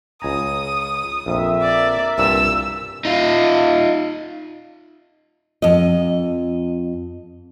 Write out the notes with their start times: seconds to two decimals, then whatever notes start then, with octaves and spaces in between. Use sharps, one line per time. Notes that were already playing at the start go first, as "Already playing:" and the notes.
0.22 C#2 G#5 A#5 D#6
1.26 A#1 F2 A#4 E5
1.62 D5
2.18 C2 G2 A#2 E6
3.05 D#4 F4
5.62 F2 D#5